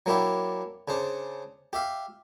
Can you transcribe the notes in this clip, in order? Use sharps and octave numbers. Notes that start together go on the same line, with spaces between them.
F#3 A#3 D4 E4 G4
C#3 D4 C5
G4 E5 F5